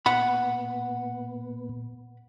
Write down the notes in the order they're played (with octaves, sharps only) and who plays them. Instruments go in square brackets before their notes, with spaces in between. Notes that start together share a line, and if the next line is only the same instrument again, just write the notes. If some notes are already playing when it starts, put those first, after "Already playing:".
[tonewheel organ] A#2 B3 [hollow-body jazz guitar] F#5 B5